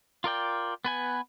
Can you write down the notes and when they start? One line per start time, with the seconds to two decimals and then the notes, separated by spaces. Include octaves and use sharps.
0.24 F4 A#4 D5 G5
0.85 B3 B4 G#5